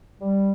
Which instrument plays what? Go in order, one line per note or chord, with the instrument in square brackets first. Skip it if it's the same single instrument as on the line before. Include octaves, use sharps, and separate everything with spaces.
[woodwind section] G3